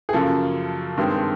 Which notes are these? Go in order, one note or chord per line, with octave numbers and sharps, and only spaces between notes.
G#4
F#2 C#3 F3 A#3 A4
G2 D#3 G#3 C4